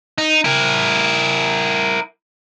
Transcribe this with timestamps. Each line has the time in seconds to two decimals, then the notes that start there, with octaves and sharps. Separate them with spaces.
0.18 D#4
0.44 E4 A#4